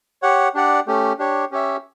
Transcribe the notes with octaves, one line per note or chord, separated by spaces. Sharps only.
G4 C#5 F#5
D4 G4 D5 F#5
A3 C#4 G4
D4 G4 C#5
C#4 G4 C#5 E5